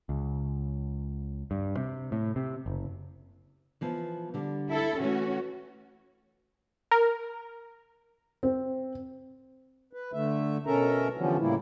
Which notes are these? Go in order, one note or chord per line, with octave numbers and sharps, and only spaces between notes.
C#2
G2
C3
A2
C3
F#1
E3 F3 B3
D3 G3
E4 A4
E3 A3 C#4 F#4
A#4
C4
B4
D3 A3 E5
B2 C#4 A4 A#4 E5 A#5
D3 E3 F3 G3 B3 C#4
A2 C#3 G3 A#3 E4